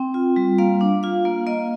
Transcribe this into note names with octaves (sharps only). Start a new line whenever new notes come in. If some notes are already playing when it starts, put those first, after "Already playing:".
Already playing: C4 G5
F4
G3
A#3 F5
D4
F4 F5
A#3
A#3 D#5